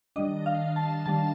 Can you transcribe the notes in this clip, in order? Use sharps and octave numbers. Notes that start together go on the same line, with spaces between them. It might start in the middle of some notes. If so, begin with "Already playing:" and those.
D#3 G3 D4 D#5
F5
A5
D#3 G3 D4 A5